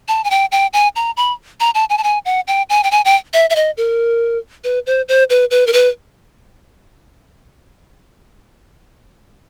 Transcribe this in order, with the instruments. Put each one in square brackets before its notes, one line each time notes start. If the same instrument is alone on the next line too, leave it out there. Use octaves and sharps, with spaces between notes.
[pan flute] A5
G#5
G5
G5
G#5
A#5
B5
A#5
A5
G#5
A5
G#5
F#5
G5
G#5
G5
G#5
G5
E5
E5
D#5
A#4
B4
C5
C5
B4
B4
A#4
B4